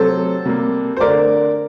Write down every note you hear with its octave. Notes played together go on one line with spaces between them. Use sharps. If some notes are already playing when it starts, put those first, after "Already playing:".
Already playing: C3 F#3 A3 A4 C5
C3 G3 A#3
C5
D3 A3 A#4 D5